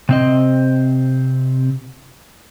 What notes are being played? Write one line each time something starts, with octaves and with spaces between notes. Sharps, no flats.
C3 C4 D#5